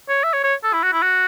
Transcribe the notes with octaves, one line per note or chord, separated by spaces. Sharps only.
C#5
E5
C#5
C#5
A4
E4
F#4
E4
F#4